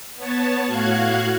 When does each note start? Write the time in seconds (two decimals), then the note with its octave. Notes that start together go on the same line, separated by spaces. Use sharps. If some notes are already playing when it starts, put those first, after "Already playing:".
0.16 B3 C#5 A5
0.65 A2 F#4 F5 F#6 G#6